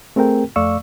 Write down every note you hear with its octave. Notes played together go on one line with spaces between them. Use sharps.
A3 C4 G#4 A#4 G5
F2 A3 D5 F5 C#6 E6